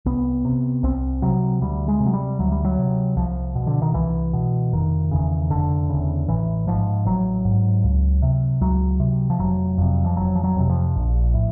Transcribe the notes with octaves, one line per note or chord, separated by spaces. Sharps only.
C2 B3
C3
C2 C4
C3 F#3
D2 G3
G#3
C3
F#3
G3
D2 F#3
G3
F#3
C3
C2 F3
B2
D3
D#3
C2 E3
B2
F1 D#3
E2 C#3
F1 D3
E2 C#3
A1 E3
G#2 F3
A1 F#3
G#2
C#2
C3
C#2 F#3
C3
F3
F1 F#3
F2 C3
F3
F1 F#3
F3
F#3
F2 C3
F3
A#1
A2